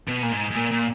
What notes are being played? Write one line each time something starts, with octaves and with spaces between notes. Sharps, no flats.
B2
A#2
G#2
G#2
A#2
A#2